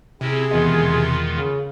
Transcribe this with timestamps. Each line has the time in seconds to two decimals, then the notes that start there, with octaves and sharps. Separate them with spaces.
0.21 C3 C4 C#4 E4 G#4
0.51 E2 B2 D#3 G#3 B3 F4
1.32 C#3